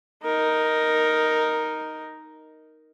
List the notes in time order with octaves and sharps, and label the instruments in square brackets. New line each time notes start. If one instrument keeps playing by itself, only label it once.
[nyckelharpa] D#4 A#4